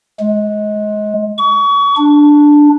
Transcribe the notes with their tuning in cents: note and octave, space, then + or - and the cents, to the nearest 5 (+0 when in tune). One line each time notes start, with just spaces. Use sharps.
G#3 +25
C#6 +30
D4 +0